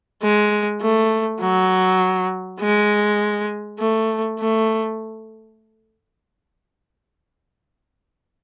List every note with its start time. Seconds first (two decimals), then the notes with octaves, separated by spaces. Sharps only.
0.23 G#3
0.82 A3
1.41 F#3
2.60 G#3
3.79 A3
4.39 A3